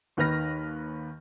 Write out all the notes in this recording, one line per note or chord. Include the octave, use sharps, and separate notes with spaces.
D#2 D#3 B4 F6 A#6